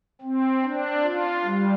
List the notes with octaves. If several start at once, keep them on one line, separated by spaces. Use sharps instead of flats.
C4
D4
F4
G3